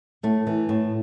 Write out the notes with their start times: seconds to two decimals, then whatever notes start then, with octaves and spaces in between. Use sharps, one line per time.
0.23 A2 A3
0.47 E3
0.69 A2